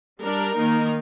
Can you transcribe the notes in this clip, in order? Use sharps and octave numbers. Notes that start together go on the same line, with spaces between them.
G3 D4 A#4
D#3 A#3 D#4